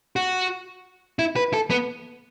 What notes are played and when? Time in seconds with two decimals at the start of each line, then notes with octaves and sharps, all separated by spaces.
0.16 F#4
1.19 E4
1.36 B4
1.53 A4
1.70 B3